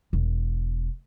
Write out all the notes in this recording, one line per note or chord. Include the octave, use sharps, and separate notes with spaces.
E1